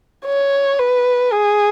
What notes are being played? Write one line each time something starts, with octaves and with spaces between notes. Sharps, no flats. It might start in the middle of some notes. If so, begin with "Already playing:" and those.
C#5
B4
G#4